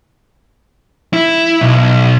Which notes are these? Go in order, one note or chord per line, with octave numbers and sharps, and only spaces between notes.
E4
B1